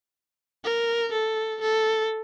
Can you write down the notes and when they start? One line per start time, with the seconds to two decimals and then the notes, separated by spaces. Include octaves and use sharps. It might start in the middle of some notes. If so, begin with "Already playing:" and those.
0.64 A#4
1.12 A4
1.61 A4